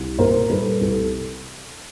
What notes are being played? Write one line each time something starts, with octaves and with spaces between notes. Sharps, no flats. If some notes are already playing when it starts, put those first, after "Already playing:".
Already playing: C2
A#2 A#4 C5
G3 A4 B4
C2 A4